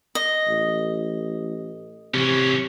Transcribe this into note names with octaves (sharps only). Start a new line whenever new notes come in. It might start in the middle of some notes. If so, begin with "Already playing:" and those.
D#5
A1
C3 E3 C#4